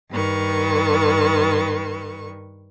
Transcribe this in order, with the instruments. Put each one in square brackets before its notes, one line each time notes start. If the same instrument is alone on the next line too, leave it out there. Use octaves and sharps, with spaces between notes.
[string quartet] G2 D#3 B4 C#6